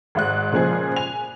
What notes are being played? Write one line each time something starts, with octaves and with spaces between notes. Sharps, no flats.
G#1 G#2 F#6
A#2 C#3 F3 G#4
G#5 F7